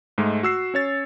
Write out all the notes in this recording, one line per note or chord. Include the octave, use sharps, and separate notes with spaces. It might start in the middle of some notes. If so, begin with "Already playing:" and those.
G#2 G#3 A3
F#4 E6 C7
C#4 C#5 A6